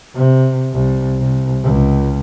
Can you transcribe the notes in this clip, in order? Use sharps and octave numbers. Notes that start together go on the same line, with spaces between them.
C3
C2
C2
C#2